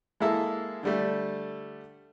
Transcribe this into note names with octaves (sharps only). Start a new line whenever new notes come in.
G#3 A#3 E4 A4
D3 G3 A3